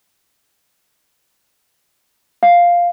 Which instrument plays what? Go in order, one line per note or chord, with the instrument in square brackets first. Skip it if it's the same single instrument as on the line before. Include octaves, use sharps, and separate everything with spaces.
[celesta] F5